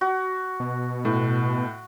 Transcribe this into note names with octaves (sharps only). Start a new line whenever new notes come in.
F#4
B2
A2